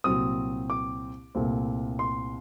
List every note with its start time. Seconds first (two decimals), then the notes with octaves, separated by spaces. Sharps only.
0.04 C2 A#2 F#3 C4 D#6
0.70 D6
1.35 C2 A#2 A3 C4
1.99 C6